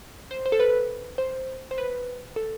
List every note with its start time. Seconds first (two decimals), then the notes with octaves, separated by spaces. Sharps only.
0.31 C5
0.46 C5
0.52 A4
0.60 B4
1.18 C5
1.71 C5
1.78 B4
2.36 A4